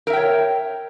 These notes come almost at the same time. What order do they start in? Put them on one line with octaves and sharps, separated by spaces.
A#4 E5 G5 C#5